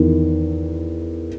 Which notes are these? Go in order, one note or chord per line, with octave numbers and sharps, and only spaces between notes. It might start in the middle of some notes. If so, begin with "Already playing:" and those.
Already playing: E2 D#3